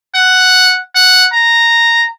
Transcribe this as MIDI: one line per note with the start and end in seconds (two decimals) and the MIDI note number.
0.15 0.80 78
0.95 1.27 78
1.33 2.08 82